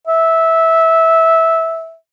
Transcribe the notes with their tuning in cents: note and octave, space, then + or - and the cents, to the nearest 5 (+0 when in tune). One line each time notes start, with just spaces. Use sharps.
E5 -15